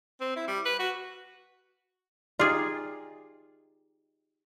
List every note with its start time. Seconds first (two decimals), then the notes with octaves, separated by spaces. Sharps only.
0.21 C4
0.36 E4
0.48 G3
0.66 B4
0.79 F#4
2.39 D#4 F4 G4 G#4 D5